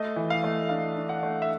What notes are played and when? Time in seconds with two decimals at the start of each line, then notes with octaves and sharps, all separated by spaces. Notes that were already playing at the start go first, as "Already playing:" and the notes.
Already playing: A3 D#5
0.16 E3
0.30 F5
0.44 A3
0.69 D4 F5
0.96 D4
1.09 F#5
1.23 A3
1.42 E5